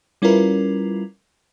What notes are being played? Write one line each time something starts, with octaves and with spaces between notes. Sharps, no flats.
G3 C#4 E4 F4 A#4 B4